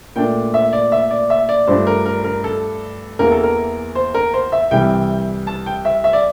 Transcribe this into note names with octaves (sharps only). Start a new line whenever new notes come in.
A#2 A3 D4 G5
E5
D5
E5
D5
E5
D5
G2 F3 A3 D4 C5
A#4
A#4
A#4
A4
E2 E3 A#3 A#4
A4
A#4
C5
A#4
C5
E5
C2 C3 E3 G3 G5
A5
G5
E5
E5
D5